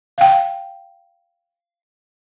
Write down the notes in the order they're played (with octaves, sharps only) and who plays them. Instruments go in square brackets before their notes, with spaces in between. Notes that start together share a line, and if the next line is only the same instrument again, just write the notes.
[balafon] F5 G5